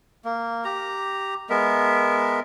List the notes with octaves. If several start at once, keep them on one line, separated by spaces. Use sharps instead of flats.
A#3
G4 A#5
G#3 B3 A#4 E5